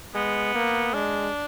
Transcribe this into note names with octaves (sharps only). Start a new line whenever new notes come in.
G#3 B3
A#3
G#3 D4